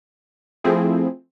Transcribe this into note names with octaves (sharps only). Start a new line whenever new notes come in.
F3 A3 C4 E4 G#4